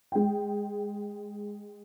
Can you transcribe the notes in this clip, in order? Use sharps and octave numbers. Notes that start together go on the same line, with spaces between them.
G#3 G5